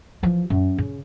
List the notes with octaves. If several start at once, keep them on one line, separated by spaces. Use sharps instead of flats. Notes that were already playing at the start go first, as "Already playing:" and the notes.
E3 F3
F#2
C#3